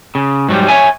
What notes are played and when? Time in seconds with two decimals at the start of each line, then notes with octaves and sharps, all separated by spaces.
0.15 C#3
0.49 G#2 F#3 G3
0.68 C#5 E5 G#5